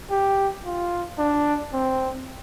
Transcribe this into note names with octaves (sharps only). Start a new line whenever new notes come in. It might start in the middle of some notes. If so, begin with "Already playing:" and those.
G4
F4
D4
C4